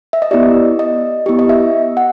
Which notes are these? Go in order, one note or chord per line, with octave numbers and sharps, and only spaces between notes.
E5
D#5
B3 E4 G4 D5
D#5
B3 E4 G4
D#5
E5
F#5